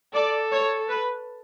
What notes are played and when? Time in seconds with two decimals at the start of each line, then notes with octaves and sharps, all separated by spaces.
0.14 A4 D5
0.52 C#5
0.89 B4